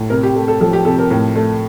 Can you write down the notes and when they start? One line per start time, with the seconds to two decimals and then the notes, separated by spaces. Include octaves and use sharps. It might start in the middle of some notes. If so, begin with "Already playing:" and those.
Already playing: A2
0.10 C3 A#4
0.23 G4
0.36 A3
0.48 A4
0.61 F3 A4
0.73 G4
0.85 C3 A4
0.99 A#4
1.11 A2
1.36 A3